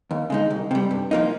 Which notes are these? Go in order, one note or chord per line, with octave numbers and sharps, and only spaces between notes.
D#2
C#3 G#3 D#4
C2
C3 G3
G2
F3 A#3 D#4